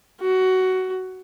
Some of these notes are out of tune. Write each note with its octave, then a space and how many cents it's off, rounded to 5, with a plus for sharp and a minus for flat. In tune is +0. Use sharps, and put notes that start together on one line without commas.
F#4 +15